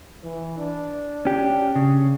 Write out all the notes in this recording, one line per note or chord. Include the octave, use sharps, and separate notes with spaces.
E3
D4
C#4 G4
C#3